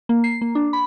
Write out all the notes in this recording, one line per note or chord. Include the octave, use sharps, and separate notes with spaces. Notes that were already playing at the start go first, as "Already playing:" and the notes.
A#3
C7
A#3
D4
B5